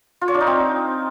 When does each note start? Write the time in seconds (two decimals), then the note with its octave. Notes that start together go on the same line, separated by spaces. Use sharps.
0.21 F4
0.28 C#5
0.34 D4
0.40 D#4
0.47 C4